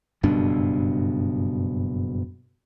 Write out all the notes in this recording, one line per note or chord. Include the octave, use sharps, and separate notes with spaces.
F#1 G2 B2 D4